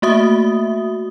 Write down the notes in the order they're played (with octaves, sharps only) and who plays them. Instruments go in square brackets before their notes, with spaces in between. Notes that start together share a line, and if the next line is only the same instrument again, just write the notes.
[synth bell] A3 A#3 F#4 E5 D#6